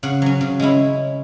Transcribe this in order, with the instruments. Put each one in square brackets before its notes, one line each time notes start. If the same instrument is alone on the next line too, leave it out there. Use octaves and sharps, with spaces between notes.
[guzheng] C#3 F#5
F#3 C#4
C#3
G#3 C#4 E4